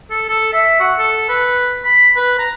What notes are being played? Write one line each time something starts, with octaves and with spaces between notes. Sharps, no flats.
A4
A4
E5
F#4
A4
B4
B5
B4
A#5